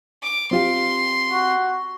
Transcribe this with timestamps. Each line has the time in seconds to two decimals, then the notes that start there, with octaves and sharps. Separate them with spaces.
0.23 D6
0.51 C4 F4 G4 C6
1.32 F#4